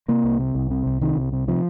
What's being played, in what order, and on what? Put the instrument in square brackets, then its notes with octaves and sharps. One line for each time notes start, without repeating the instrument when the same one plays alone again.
[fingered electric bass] C3 A#3
C2
C3
C2
C3
C2
C3 D#3
C2
C3
C3 F3